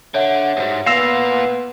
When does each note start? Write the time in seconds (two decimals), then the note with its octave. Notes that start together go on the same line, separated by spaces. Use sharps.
0.14 D3 C#5 E5 F#5
0.57 E2 G#2 G3 F#4 C5
0.86 A#2 B3 F4 F5 E6 A#6 E7 F7